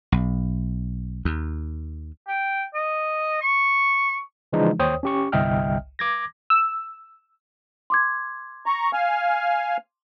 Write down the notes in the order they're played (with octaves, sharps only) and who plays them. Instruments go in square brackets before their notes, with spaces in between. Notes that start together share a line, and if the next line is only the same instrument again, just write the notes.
[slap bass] B1
D#2
[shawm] G5
D#5
C#6
[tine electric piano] C#3 E3 F3 G#3 D4 D#4
D#2 C5 C#5 G5 D#6
C#4 G4 C#6
G1 C2 D#5 E5 G5 F6
D6 G#6 A#6
[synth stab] E6
[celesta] C6 D6 G#6
[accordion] A#5 C#6
F5 G#5 F6